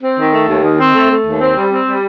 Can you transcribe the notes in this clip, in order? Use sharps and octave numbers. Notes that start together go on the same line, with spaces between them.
C4
D#3
A3
D#2
D#3
C4
A3
A3
D#2
C4
G3
C4
G3